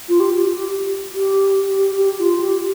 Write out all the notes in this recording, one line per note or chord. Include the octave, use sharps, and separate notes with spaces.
F4
G4
G4
G4
G4
G4
F4
G4